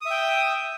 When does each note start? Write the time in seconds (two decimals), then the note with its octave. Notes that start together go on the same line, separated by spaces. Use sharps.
0.01 D#6
0.06 E5
0.10 G5